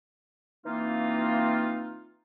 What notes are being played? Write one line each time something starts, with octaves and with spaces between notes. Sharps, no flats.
E3 A#3 C4 D#4 F4